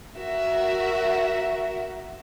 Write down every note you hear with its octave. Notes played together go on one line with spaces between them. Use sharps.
F#4 A#4 E5